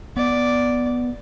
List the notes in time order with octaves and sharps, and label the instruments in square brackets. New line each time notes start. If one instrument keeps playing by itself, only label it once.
[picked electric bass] B3 [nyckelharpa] D5